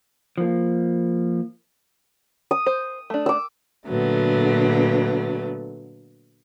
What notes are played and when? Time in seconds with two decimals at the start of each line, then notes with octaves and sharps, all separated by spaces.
0.38 F3 A#3
2.51 D#6
2.66 C5
3.10 A3 D4
3.26 D6 E6
3.88 A#2 D3 F#3 A3 B3